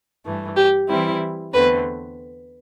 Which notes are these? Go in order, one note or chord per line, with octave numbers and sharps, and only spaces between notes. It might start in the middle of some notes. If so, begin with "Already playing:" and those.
G2 E3 A3
G4
E3 G3 C4 E4
E2 D3 A3 C4 B4